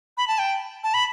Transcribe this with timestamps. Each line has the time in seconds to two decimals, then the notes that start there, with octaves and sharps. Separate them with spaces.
0.17 B5
0.28 A5
0.39 G5
0.83 A5
0.94 B5